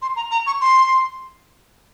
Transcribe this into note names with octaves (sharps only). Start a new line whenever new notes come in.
C6
A#5
A#5
C#6
C6